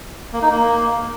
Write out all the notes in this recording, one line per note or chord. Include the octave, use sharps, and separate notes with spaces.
A#3
D#4
A#3